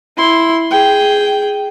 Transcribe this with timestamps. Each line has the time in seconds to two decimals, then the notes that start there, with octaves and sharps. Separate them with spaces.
0.17 E4 C6
0.71 G#4 G5